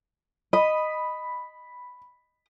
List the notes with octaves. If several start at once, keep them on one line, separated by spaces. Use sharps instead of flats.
D#5 B5